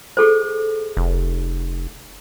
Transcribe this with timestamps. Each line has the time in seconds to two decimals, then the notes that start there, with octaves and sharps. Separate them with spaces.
0.17 G#4 A4 C5
0.97 F1